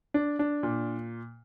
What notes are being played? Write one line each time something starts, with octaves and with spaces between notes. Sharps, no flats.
D4
D4
A#2